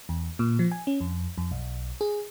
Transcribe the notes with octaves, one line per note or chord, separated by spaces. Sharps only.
E2
A#2
F3
G#5
C#4
F2
F2
B1
G#4